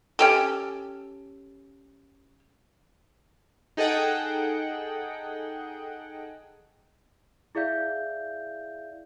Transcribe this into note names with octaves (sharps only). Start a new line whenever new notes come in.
C#4 G4 A4
D#4 G#4 A4 D#5 F#5 G5
E4 G#4 D5 E5 F5 G6